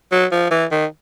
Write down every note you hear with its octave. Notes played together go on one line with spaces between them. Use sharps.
F#3
F3
E3
D#3